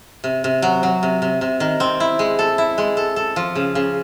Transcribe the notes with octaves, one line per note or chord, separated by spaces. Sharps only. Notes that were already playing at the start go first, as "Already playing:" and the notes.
C3
C3
F#3
F#3
C3
C3
C3
D#3
C4
E4
G#3
A4
E4
G#3
A4
A4
F3
C#3
C#3